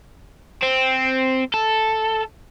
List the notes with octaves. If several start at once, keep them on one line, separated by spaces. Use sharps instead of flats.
C4
A4